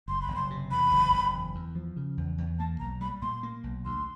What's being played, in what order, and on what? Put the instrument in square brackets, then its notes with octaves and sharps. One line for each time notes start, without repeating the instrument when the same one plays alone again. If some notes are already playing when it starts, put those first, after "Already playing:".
[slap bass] F#1 [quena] C6
[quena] B5
[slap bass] F#1
[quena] C6
[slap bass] C3
[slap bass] E2 [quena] B5
[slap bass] F#1
F#1
E2
E2
F3
C#3
E2
E2
[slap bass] A#3 [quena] A5
[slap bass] B1 [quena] A#5
[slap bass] G3 [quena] B5
[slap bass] A#2 [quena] C6
[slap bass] A#3
B1
[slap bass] D2 [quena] C6